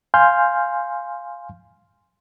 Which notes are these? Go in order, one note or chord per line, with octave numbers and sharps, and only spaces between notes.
F5 G#5 C6 F6 G6